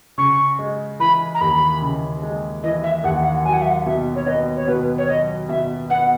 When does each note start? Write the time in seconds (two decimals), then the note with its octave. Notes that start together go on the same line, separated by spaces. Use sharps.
0.18 C#3 C#6
0.59 G#3
1.00 E3 B5
1.34 A#5
1.41 D#2 B5
1.82 C#3
2.23 G#3
2.63 E3 D#5
2.84 E5
3.04 D#2 F#5
3.20 E5
3.24 F#5
3.45 F#3 G#5
3.53 F#5
3.62 E5
3.70 F#5
3.85 B2 E5
4.16 C#5
4.26 B3 D#5
4.56 C#5
4.67 B2 B4
4.98 C#5
5.08 F#3 D#5
5.49 B2 E5
5.90 B3 F#5